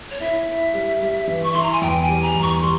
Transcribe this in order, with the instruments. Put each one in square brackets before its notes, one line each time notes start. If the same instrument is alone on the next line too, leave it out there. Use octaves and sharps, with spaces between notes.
[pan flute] C#5
[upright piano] E4 [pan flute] E5
[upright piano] E4
G3
G3
E3
[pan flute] C#6
[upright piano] E4 [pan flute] C6
[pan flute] A#5
G#5
[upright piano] E2 [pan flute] G5
[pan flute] G#5
[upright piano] G3
[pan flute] A#5
[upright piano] E2
[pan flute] C#6
[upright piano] G3 [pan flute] C6